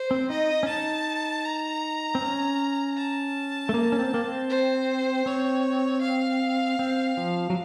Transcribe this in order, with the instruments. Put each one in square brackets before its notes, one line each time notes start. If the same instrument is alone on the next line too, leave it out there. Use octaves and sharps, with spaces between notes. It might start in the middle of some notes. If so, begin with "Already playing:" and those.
Already playing: [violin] C5
[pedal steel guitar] C4
[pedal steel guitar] D#4 [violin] D#5
[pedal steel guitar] C#4
[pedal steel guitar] D#4 [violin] A5
[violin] A#5
[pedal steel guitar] C4
C#4
[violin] A5
[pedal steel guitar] A3
A#3
C#4
C4
A#3
C4
[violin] C5
[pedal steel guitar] C4 [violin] C#5
[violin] F5
[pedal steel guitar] C4
F3
F#3